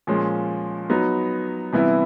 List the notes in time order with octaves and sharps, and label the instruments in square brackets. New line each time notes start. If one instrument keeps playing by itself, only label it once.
[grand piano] A#2 F3 G#3 C#4
F#3 B3 D#4
C3 E3 G3 B3 E4